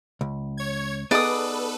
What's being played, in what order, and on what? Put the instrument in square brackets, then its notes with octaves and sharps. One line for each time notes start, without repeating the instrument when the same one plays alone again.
[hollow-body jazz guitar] C#2
[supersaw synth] C#5 G#6
[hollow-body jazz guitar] B3 D#4 G#4 [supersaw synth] A4 B4 [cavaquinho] D5 D#6